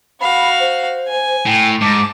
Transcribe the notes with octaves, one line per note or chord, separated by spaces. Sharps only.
F#4 F5 B5
C5
G#5
A2 G5
G#2 A5 D6